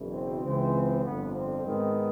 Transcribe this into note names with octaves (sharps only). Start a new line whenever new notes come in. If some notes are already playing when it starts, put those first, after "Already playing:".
Already playing: F#1 E2 B2
C4
C#2 C#3 E3 C4
G1 F2 D3 B3
C4
G#2 D#3 G#3 B3